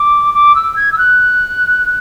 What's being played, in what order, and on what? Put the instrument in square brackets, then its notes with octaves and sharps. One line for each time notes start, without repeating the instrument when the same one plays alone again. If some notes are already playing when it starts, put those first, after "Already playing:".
Already playing: [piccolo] D6
D6
E6
G#6
E6
F#6